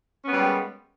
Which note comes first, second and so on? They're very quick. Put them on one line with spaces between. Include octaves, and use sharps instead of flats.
C#4 B3 G3 A#3 G#3